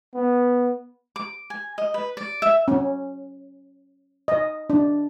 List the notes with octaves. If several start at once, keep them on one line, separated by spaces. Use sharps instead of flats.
B3
D6
G#5
D#5
B4
D5
E5
C#4
D#5
D4